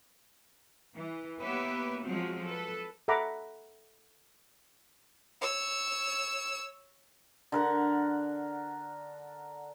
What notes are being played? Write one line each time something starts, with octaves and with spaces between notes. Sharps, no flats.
E3
A#3 B3 G4 B4 C#5 E5
F3 F#3 G#3 C4 F#4
A4 B4
A4 E5 F#5 A#5 B5 D6
C#5 E6
D3 A#4 F#5